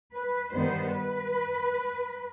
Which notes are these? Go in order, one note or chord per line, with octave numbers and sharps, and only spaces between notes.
B4
G2 D#3 G3 B3 C5
B4